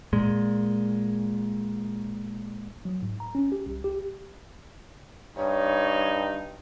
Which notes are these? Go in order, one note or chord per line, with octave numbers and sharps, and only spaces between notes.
A#2 G#3
F#3
G#2
A#5
C#4
G4
C2
G4
G2 D#4 C#5